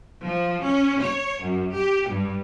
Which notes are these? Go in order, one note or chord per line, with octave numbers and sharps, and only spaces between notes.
F3
C#4
C#5
F#2
G4
G2